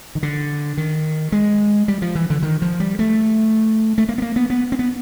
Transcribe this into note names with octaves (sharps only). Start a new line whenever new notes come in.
D#3
D3
D#3
G#3
G3
F3
E3
D3
D#3
F3
G3
A3
A3
A#3
B3
A#3
B3
B3
C4
B3